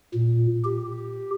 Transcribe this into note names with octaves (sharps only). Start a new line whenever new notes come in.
A#2
G4